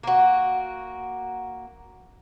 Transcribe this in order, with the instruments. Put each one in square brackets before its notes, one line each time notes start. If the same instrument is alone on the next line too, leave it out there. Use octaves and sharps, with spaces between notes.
[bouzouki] A#3 F#4